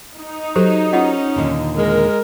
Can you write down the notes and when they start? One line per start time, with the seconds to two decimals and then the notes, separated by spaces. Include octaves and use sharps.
0.18 D#4
0.56 F#3 G4 A4 C5
0.93 C#4 F4 D#5 F#5
1.36 D#2 A#2 D3
1.77 G#3 A#4